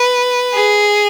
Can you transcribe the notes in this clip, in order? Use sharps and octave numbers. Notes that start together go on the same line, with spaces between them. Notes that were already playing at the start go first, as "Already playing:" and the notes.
Already playing: B4
G#4